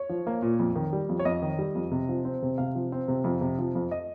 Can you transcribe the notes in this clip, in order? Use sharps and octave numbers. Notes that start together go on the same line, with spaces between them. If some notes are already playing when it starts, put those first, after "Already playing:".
Already playing: C#5
F3
A#3
A#2
F2
D#3
G3
F2
C#5
F2 D#5
D#3
G3
F2
C3
F3
C4
C3
C3 F5
F3
C4
C3
F2
C3
F3
F2
D#5